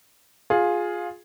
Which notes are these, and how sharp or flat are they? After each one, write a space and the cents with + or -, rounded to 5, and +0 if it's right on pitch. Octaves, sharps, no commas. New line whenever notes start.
F4 +15 G#4 +0